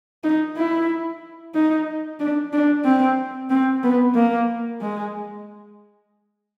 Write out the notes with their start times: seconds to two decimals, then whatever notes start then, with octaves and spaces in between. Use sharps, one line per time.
0.24 D#4
0.57 E4
1.55 D#4
2.20 D4
2.53 D4
2.85 C4
3.50 C4
3.84 B3
4.15 A#3
4.81 G#3